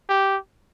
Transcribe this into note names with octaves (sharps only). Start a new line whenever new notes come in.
G4